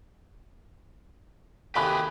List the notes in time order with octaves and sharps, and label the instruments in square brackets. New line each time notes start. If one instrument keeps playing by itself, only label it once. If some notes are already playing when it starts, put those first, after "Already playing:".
[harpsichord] D#2 C3 A3 [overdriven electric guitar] G4 G#4 [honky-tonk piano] G#5 B5 F#6